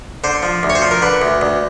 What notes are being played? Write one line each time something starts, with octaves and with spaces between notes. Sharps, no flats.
D3 C5
F3
D2
C#5
C5
F3
A#4
D3 B4
D2
D2